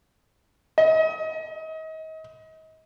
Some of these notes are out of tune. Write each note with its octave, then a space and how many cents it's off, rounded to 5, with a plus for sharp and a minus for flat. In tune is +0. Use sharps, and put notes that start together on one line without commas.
D#5 +35